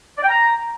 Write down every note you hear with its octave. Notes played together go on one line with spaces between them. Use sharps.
D5
G5
A#5